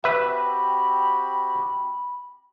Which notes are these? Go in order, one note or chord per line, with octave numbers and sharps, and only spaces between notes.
C4 F#4 G4 B4 E5 B5